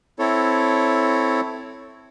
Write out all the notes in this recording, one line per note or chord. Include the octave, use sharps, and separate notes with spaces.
C4 E4 A4 C#5